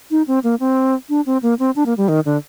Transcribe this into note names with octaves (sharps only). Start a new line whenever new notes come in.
D#4
C4
A#3
C4
D4
C4
A#3
C4
D4
A#3
G3
D#3
D3